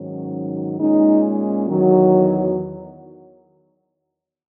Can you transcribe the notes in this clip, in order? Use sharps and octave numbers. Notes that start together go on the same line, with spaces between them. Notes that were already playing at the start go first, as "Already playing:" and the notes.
Already playing: G#2 D#3 F#3 C#4
A#2 G#3 C#4 D#4
E2 D#3 F#3